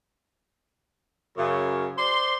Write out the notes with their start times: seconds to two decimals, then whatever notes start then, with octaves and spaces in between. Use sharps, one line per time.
1.38 F#2 C#3
1.98 C5 D5 C6